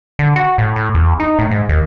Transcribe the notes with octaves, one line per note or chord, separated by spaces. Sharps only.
D3
F#4
A2
A2
E2
D#4
A2
G#2
D#2